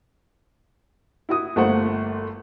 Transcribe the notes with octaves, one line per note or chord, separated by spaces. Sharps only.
E4 F#4 D#6
G1 A3 A#3 C5 F#5